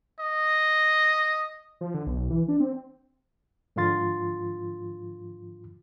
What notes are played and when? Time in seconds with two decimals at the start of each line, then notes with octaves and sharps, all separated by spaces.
0.20 D#5
1.81 F3
1.94 D3
2.06 B1
2.30 E3
2.48 D4
2.60 C4
3.76 G#2 D3 F3 F4 C6 A6